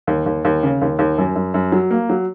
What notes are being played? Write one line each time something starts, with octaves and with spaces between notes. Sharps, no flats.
D#2
D#2
D#2
C#3
D#2
D#2
F#2
F#2
F#2
F#3
A#3
F#3